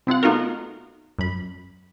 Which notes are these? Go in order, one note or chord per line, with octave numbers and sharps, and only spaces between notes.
C3 C4 F4 F#5
A3 B3 D#4 F4 F#4 A#4
F#2 B5